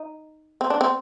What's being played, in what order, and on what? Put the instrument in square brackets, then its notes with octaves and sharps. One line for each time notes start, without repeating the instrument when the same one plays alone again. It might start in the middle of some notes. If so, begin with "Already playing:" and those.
Already playing: [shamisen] D#4
C4
D4
C4